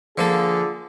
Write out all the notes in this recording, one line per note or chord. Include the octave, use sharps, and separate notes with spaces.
D3 F3 A#3 F4 G#4 A4